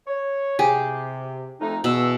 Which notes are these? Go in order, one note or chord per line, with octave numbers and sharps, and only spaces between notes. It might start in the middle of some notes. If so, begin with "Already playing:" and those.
C#5
C3 G4 G#4
F2 A3 D#4
E2 B2 E6